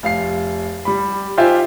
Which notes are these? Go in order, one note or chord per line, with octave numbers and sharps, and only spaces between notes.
F1 F5 C7
G3 B5
D#4 F4 G4 C5 E5 G#5